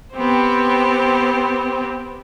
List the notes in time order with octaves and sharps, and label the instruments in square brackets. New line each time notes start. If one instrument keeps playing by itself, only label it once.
[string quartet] B3 C4 G4 C5